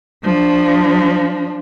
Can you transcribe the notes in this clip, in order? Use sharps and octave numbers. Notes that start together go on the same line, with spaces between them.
F3 D4